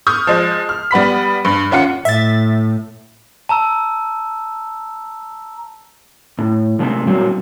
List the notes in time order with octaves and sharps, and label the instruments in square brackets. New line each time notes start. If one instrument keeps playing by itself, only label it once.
[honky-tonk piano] C#6 D#6 F6 G6
F3 G#3
F6
G3 B3 B5 B6
G2
D#2 C#4 F4 F#5 C#7
[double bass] A2 [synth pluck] E5 A6
[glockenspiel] A5 A#5 E6
[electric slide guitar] A2
C3 G#3 A3 B3 C4
A#2 F#3 G3 C4